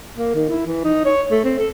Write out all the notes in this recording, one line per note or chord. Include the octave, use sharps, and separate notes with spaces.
A#3
D#3
E4
E3
D#4
C#5
A3
C4
A4